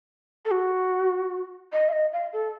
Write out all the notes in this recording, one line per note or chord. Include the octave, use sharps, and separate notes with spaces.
A4
F#4
D#5
F5
D#5
F5
A4